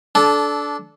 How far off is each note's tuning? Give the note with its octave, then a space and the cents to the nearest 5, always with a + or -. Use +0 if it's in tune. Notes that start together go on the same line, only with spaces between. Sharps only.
D4 -10 A4 -20